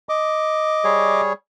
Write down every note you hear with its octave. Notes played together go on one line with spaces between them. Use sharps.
D#5 D6
G3 G#4 C#5